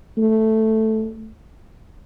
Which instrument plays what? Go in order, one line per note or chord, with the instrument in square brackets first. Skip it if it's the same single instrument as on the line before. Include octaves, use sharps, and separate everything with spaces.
[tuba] A3